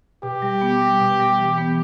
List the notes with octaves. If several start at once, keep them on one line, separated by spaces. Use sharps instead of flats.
B2 G4
G3
B3
G3
B2
G3
E3
B3